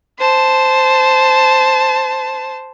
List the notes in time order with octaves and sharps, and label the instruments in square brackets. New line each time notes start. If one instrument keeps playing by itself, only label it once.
[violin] C5 A5